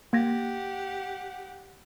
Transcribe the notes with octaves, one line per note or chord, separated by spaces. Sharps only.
A#3 G4 F#5 G#6 A#6